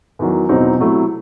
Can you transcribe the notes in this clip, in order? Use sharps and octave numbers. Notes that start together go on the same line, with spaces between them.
E2 D#3 F#3
E2 B2 F#3 C4 D#4
C3 F#3 A3 E4